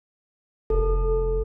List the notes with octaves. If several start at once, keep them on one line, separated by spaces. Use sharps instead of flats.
F1 A4